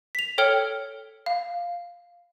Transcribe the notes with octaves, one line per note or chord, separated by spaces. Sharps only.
B6 F7
A4 C#5 G5 F6 C#7 G7
F5